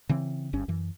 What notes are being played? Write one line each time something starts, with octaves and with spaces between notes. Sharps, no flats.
C#3 E3 C4
G1 G2 C#4
F#2 E3